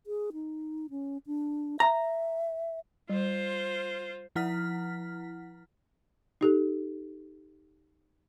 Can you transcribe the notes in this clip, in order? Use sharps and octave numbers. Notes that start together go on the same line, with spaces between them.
G#4
D#4
C#4
D4
E5 A#5
G3 F4 C5
F3 E4 F#5 F6 B6
D#4 G4 A4